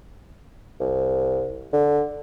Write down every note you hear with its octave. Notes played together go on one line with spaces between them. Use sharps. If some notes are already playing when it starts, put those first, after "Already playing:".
C2
D3